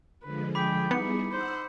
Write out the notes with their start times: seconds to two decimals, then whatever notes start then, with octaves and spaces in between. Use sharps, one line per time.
0.23 D3 F3 G#3 B4
0.55 G#4 G5 B5 D6 B6
0.91 G3 B3 D#4 E4 G#4 C#7
1.31 D#4 C5 F#5 E6 F#6